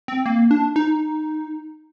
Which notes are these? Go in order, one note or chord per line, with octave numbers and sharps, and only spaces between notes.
C4
A#3
D4
D#4